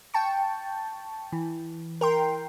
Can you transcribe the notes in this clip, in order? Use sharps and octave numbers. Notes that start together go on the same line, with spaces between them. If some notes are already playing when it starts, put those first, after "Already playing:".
G5 A5 C#6
E3
A#4 G5 C6